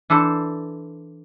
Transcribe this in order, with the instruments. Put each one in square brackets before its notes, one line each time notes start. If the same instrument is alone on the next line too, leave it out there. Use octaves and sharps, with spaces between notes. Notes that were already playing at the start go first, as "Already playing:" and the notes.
[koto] E3 D4 A4 C5 A5